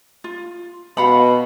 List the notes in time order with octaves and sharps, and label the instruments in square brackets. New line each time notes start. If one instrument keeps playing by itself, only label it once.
[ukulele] F4
[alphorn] B2 [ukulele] F5 F#5 B5